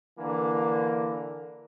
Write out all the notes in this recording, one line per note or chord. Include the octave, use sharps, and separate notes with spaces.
D3 E3 A#3